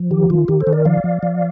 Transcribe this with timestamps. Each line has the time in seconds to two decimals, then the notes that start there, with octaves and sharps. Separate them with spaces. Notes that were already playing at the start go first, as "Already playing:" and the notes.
Already playing: F3
0.11 D#3 G4
0.30 D#3 F4
0.48 D#3 G4
0.60 A4 C5
0.67 D#3
0.73 A#4 D5
0.85 F3 D5 F5
1.04 F3
1.23 F3